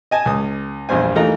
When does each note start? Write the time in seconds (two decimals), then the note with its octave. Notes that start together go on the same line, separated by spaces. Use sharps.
0.11 D#5 G#5 A5
0.26 C#2 D#6
0.89 A#1 E2 G2 C5 G#5
1.16 E3 A3 D#4 F4 A#4 A#5